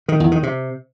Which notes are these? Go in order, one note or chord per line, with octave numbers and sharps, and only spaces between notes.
D#3
E2
D#3
C3